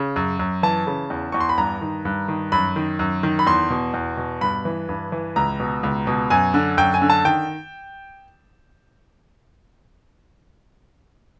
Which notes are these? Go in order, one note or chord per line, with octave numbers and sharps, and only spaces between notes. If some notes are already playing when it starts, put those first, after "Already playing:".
Already playing: C#3
F#2
F#2
E3 A5
C#3
E2
E2 C#6
C6
B5
G2 A#5
D#3
G2
D#3
F#2 B5
D#3
F#2
D#3
B5
E2 C6
B2
E2
B2
G2 B5
E3
G2
E3
C#2 A#5
B2
C#2
B2
F#2 G#5
D3
F#2 G5
G#5
D3
A5
D#3 G5